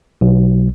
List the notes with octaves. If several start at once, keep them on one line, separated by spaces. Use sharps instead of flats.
B1